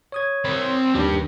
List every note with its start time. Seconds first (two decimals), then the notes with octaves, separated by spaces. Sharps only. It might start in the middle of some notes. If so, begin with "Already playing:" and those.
0.12 C#5 D#6 G#6
0.45 C4 B5
0.95 D#2 D#3 D4 G4